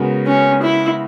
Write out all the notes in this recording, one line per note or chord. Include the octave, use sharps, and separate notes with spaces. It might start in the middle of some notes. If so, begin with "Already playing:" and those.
Already playing: C#3 G#3 B3 F#4 A#4
C#4
E4